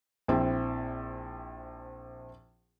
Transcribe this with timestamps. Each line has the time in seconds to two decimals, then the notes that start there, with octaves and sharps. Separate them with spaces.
0.28 A#1 C4 E4